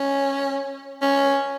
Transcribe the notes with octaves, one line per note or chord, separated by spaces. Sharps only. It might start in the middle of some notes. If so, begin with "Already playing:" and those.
Already playing: C#4
C#4